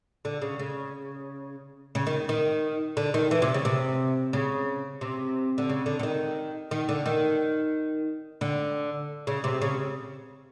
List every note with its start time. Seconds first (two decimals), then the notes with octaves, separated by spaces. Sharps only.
0.25 D3
0.42 C#3
0.59 C#3
1.95 C#3
2.07 D#3
2.29 D#3
2.97 D3
3.14 D#3
3.31 E3
3.42 C3
3.54 C#3
3.65 C3
4.33 C#3
5.01 C3
5.58 D3
5.69 C#3
5.86 D3
5.99 D3
6.03 D#3
6.71 D#3
6.89 D3
7.06 D#3
8.41 D3
9.27 C#3
9.44 C3
9.62 C#3